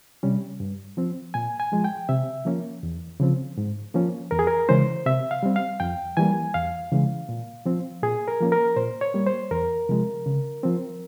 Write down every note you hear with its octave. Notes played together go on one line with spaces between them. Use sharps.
C3 G3 C#4
G2
F3 C4
A#2 G#5
G#5
F3 G#3
G5
C3 E5
F3 A#3 C#4
E2
C#3 F3 C4
G#2
F3 A#3 C#4
E2 A#4
G#4
A#4
C#3 E3 G#3 C#4 C5
C3 E5
F5
G3 C4
F5
F2 G5
E3 G3 A#3 G#5
E2 F5
C#3 E3 G#3
A#2
F3 C4
A#2 G#4
A#4
F3 A#3 C#4
A#4
A#2 C5
C#5
G3 A#3
C5
E2 A#4
C3 F3 G#3
C#3
F3 C4